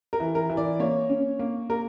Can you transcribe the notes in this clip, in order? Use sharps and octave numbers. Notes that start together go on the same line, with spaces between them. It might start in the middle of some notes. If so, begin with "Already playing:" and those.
A#4
E3
A#4
E3
D5
A#3 C#5
C#4
A#3
A#3 A#4